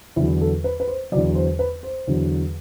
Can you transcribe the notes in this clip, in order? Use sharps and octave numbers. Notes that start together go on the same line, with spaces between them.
E2 D3 F#3 E4
A4
B4
B4
C5
E2 D3 F#3 D5
C5
B4
C5
E2 D3 F#3